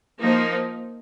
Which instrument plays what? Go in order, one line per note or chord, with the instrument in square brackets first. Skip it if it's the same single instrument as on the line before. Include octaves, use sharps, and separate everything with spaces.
[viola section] F3 A#3 D#4